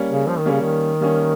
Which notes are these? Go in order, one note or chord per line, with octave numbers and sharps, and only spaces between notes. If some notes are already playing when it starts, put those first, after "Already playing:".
Already playing: G3 A#3 C#4
C#3
F3
D#3
C#3 G3 A#3 C#4
D#3
G3 A#3 C#4